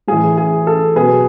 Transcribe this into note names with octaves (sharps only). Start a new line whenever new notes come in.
A2 E3 G#4
G#4
A4
B2 F#3 G#4 B4